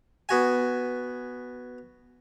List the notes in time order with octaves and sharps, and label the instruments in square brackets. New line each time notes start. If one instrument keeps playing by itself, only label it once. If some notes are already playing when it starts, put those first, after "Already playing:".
[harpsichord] B3 F#4 G#5